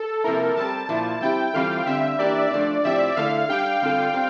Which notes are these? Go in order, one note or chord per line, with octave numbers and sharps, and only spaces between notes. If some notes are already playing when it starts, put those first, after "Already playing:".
Already playing: A4
C3 F3 A#3 E4 A#4
G3 C4 G4 A5
A#2 F3 A#3 E4
G3 C4 E4 G4 G5
E3 G3 C4 F4 A4 F5
D3 G3 C4 E5
E3 A#3 D4 G4 D5
F3 A3 D4
A2 F3 C4 E4 G4 E5
D3 A3 E4 A4 F5
G3 D4 G4 G5
D3 G3 C4 F4 A4
G3 C4